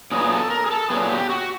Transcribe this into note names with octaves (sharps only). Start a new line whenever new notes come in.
A#2 F#3 B3 G#4
A4
A#4
G#4
A4
A#2 F#3 B3 G#4
G4
F#4